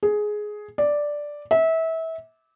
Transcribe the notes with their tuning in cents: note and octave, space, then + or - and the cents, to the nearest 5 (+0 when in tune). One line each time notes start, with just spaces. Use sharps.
G#4 +10
D5 +0
E5 -25